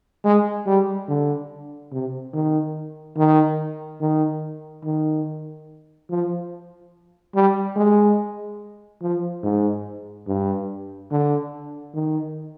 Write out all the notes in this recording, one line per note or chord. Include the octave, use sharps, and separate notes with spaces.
G#3
G3
D3
C3
D#3
D#3
D#3
D#3
F3
G3
G#3
F3
G#2
G2
D3
D#3